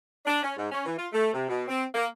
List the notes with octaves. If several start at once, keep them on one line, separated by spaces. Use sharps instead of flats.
D4
C#4
G#2
C#4
E3
F4
A3
C3
B2
C4
A#3